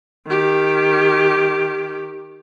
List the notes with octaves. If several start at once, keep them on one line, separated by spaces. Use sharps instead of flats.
D#3 G4